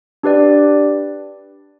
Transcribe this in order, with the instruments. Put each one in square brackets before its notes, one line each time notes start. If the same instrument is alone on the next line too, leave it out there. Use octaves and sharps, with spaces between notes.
[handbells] D4 G4 B4 D5